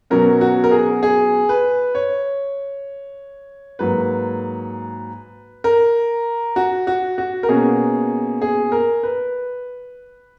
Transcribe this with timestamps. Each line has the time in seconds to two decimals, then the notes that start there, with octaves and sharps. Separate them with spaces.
0.10 B2 F#3 C#4 A#4
0.41 F#4
0.64 A#4
0.71 G#4
1.03 G#4
1.49 B4
1.95 C#5
3.79 G#2 F#3 A#3 B4
5.64 A#4
6.56 F#4
6.87 F#4
7.18 F#4
7.43 A#4
7.49 B2 A#3 C#4 G#4
8.42 G#4
8.72 A#4
9.03 B4